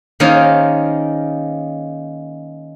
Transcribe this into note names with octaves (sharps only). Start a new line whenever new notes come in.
D#3 A#3 C#4 F4 G#4 C5